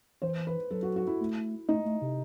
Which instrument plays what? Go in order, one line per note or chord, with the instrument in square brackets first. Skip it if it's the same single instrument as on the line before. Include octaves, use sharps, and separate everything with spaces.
[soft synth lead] E3 [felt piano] C5
[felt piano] B4
[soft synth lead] F#3 [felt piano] A4
[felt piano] F#4
F#4
E4
[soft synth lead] A3
[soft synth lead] A3 [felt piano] D#4
[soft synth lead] A3
C3